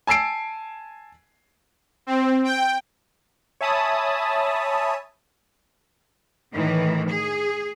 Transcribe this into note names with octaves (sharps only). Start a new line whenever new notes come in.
G#5 A5 E6 C7 D7
C4
G5
C#5 E5 G#5 A5 B5 D#6
A2 D#3 E3
G#4